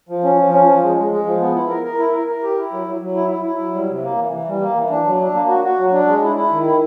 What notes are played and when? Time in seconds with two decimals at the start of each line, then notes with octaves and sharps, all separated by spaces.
0.09 F3
0.24 C#4
0.38 F3
0.53 C#4
0.67 F3
0.83 G#3
0.97 G#3
1.11 G#3
1.26 F3
1.40 B3
1.55 E4
1.69 A#4
1.84 A#4
1.98 E4
2.13 A#4
2.27 A#4
2.43 G4
2.58 E4
2.72 F#3
2.87 F#3
3.01 F#3
3.15 E4
3.31 E4
3.45 E4
3.59 F#3
3.74 G3
3.89 C3
4.03 A#3
4.18 E3
4.32 E3
4.47 G3
4.61 A#3
4.76 E3
4.90 D4
5.06 F#3
5.20 D4
5.35 A#3
5.49 F#4
5.64 F#4
5.79 F#3
5.93 D4
6.08 G#3
6.22 E4
6.36 E4
6.51 D#3
6.67 E4